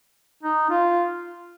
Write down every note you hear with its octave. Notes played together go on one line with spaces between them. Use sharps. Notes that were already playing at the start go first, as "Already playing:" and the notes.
D#4
F4